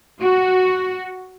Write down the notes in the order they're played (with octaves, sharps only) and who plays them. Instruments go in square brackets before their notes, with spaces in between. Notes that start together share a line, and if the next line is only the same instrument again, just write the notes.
[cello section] F#4